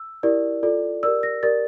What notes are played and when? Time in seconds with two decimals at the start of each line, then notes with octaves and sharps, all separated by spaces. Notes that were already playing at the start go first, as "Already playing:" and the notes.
Already playing: E6
0.23 E4 G4 A#4 D5
0.63 F4 A4 D5
1.03 G4 A#4 D5 E6
1.23 A#6
1.43 G4 A#4 D5 A6